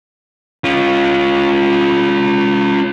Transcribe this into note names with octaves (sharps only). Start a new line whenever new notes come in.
C#4 F4